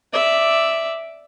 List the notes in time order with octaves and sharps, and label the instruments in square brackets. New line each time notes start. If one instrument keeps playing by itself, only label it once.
[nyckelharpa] D5 E5